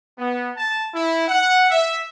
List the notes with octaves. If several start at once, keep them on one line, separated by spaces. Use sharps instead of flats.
B3
A5
E4
F#5
E5